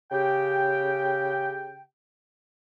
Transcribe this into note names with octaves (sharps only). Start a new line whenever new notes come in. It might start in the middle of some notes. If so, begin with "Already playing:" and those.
C#3 G4 G5